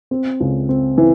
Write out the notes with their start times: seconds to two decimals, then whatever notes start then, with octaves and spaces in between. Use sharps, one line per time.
0.11 C4
0.40 C#2
0.69 C4
0.98 E3